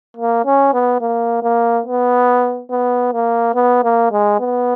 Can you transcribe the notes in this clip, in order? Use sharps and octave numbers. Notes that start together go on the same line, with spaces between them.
A#3
C#4
B3
A#3
A#3
B3
B3
A#3
B3
A#3
G#3
B3